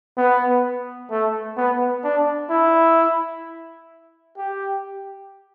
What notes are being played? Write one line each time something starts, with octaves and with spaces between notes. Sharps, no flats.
B3
A3
B3
D4
E4
G4